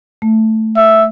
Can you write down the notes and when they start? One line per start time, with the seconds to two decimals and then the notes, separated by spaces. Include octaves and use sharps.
0.22 A3
0.77 E5